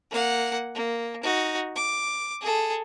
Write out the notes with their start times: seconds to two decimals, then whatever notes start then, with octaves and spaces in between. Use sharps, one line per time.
0.11 A#3 F#5
0.75 A#3
1.23 D#4 F#4
1.75 D6
2.41 G#4 A4